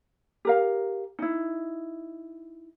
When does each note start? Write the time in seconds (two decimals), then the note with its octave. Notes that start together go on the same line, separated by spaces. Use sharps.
0.45 G4 A#4 F5
1.19 D#4 E4